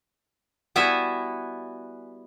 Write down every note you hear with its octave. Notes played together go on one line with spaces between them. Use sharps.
G3 B3 E4 F#4 E5 G#5